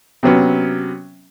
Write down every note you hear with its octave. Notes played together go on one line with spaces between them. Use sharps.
C3 F#3 B3 C#4